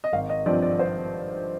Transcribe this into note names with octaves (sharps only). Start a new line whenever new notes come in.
D#5
G#1 F5
D#5
G2 F3 C4 D5
D5
C5